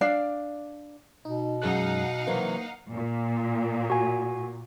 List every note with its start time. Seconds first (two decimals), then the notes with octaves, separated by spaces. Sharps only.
0.01 D4 D5 F5
1.25 B2 D#4
1.62 F#2 G#3 D#4 F5 F#5 F#6
2.27 C3 E3 F#3 A#3
2.93 A#2
3.90 F#4 G#5